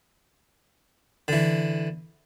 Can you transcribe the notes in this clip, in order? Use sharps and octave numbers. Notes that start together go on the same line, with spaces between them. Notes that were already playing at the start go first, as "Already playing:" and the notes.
D3 E3